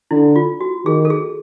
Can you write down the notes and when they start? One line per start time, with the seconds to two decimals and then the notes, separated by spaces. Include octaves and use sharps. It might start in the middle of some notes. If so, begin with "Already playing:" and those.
0.11 D3 E4
0.36 F4
0.61 F#4
0.86 D#3 G#4
1.05 A4
1.10 G#4